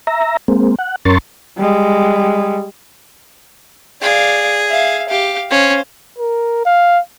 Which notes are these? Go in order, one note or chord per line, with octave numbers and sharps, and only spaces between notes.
E5 A#5
G#3 A#3 C4
F#5
F#2 C#4 A#4 C6 C#6 A6
G3 G#3
G#4 D5 F5
E5 F5
G4 F5
C#4 C5 F5
A#4
F5